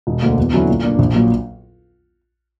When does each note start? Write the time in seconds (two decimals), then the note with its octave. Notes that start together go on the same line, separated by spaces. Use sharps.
0.07 E1
0.22 D2 D3 A#3
0.38 E2
0.53 D3 F#3 C#4 E4
0.68 A#2
0.84 A#3 D4
0.99 A#1
1.14 A#2 F#3 A#3